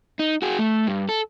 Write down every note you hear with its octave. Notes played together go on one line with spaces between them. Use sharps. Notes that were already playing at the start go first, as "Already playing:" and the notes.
D#4
F#4 G#4
A3
G2
A4